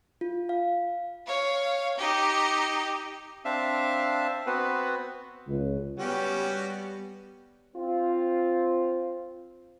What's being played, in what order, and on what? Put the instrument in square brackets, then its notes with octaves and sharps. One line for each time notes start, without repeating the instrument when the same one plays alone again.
[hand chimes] F4
F5
[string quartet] C#5 F5
D#4 G4
[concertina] C4 D4 E5 F5
B3 C4 F#4 B4
[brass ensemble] C#2
[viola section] G3 B3 [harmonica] C#4 F#4 G4
[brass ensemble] C4 F4